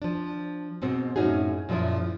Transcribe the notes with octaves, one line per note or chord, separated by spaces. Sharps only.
F3 D4
G#2 B2 C4
F#2 A2 C#4 D#4 F#4 G#4
F#2 A#2 F3 G#3 E4